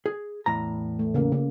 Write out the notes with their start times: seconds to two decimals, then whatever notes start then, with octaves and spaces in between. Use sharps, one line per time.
0.06 G#4
0.46 E2 A2 A#5
0.99 A3
1.14 C#3 A#3
1.32 C#3 A#3